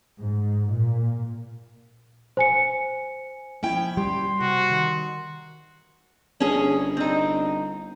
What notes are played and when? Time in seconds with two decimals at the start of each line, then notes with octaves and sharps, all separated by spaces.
0.21 G#2
0.73 A#2
2.37 C5 G#5 C#7
3.63 F3 C#4 E4 G5
3.97 G3 G4 C6
4.41 C3 F#4
4.70 D#3
6.40 G1 C#4 G#4
6.97 C4 D#4